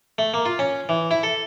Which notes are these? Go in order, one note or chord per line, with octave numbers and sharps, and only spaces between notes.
A3
A#3
F4
C#4
E3
E4
A4